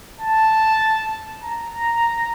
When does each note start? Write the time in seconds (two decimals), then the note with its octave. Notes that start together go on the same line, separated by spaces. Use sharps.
0.20 A5
1.43 A#5